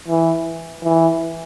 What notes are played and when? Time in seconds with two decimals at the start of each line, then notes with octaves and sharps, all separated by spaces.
0.08 E3
0.84 E3